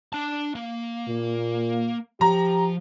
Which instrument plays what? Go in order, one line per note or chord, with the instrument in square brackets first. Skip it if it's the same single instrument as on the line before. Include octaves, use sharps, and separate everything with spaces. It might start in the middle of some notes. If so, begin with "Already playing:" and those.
[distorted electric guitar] D4 A5
A#3
[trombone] A#2
[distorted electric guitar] F3 [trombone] G4 [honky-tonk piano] A#5